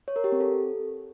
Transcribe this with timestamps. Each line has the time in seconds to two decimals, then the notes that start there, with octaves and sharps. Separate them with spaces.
0.08 C#5
0.16 A#4
0.24 G4
0.32 C4
0.40 A4